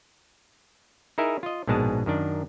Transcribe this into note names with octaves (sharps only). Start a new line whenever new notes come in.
D#4 E4 G#4 A#4 E5
F4 D#5
A#1 G#2 B2 G#3 G#4 A5
F#2 D#3 D4